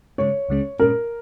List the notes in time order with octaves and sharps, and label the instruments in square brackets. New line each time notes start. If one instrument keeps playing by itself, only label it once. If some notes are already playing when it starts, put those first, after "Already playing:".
[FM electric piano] C#3 G#3 C#4 [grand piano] C#5
[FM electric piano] C#2 C#3 G#3 C#4
[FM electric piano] A#2 G#3 C#4 [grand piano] A#4